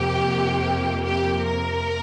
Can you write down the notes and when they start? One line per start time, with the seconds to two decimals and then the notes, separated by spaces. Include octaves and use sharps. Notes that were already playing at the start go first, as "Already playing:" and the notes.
Already playing: F2 C3 A#3 G4
1.04 G4
1.47 A#4